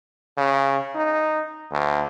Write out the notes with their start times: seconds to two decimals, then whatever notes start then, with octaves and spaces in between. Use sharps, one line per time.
0.37 C#3
0.95 D#4
1.72 D2